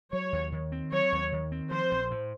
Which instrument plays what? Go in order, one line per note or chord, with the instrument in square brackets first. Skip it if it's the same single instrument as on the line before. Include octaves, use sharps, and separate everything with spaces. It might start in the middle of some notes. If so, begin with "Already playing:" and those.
[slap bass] F#3 [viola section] C#5
[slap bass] D#2
D#3
C4
[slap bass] F#3 [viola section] C#5
[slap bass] D#2
D#3
C4
[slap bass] F3 [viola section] C5
[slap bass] A#1
A2